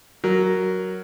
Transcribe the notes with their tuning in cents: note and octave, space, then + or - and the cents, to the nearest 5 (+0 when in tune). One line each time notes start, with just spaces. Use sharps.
F#3 +5 A#4 +0